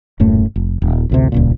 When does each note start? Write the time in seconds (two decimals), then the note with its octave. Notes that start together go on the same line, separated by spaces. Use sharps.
0.20 D#1 F#2 A2 A3
0.56 F1
0.82 D#1
1.09 A1 D2 C3
1.32 D#1 C#2 A#2